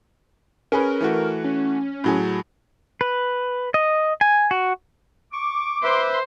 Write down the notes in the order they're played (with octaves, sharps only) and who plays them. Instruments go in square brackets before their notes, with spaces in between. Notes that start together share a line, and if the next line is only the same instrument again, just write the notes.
[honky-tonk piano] C#4 G#4 B4 [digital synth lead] A#4
[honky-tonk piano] E3 A3 F#4
[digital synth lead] C#4
[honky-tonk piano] A2 F#3 G#4
[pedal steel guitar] B4
D#5
G#5
F#4
[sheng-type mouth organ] C#6 [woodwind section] D6
[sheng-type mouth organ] B4 E5 [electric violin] C5 C6